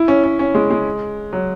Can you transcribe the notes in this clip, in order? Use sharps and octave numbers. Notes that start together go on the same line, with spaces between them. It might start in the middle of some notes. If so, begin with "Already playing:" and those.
Already playing: E4
C#4
C#4
C#4
G#3
G#3
F#3